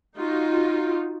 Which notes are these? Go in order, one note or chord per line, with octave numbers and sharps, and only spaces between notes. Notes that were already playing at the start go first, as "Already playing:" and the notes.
D#4 F4 F#4